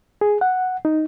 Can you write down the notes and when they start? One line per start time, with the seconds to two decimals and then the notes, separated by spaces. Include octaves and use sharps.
0.21 G#4
0.41 F#5
0.85 D#4